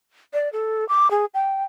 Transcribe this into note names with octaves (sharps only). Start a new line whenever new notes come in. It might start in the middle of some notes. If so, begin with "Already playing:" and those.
D5
A4
D6
G#4
G5